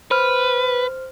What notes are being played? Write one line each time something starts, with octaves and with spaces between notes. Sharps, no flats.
B4 C5 F6